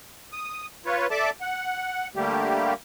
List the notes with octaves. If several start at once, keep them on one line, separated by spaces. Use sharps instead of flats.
D#6
F4 B4 C#5
A4 D5 E5 A5 D6
F#5
D3 G3 A3 A#3 G4